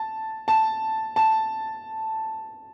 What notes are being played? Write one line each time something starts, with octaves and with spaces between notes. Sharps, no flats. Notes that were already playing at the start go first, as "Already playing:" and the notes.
Already playing: A5
A5
A5